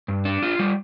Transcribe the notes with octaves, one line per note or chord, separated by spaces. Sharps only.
G2
D4
F4
G3